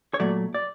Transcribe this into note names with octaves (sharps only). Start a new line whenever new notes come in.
C#5
A#2 F#3 A3 D5
D5